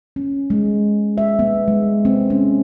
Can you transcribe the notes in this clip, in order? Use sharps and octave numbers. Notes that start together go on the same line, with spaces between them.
C#4
G#3
E5
B3
G#3
C4
C#4